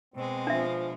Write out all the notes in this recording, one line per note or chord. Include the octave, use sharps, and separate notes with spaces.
B2 G#3 C4
F3 D4 E5